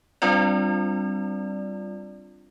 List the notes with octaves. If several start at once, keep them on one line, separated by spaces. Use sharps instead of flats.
G3 C4 D4 F4 D5